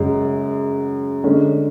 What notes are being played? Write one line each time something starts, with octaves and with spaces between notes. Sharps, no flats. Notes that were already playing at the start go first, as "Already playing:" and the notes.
Already playing: F#2 C#3 G#3
D3 G#3 C#4